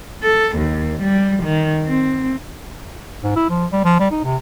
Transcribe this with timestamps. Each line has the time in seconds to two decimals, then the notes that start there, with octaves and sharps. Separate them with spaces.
0.23 A4
0.57 D#2
1.02 G3
1.43 D#3
1.85 C4
3.23 G#2
3.36 E4
3.50 F3
3.72 G3
3.85 F3
3.99 G3
4.11 D#4
4.24 C3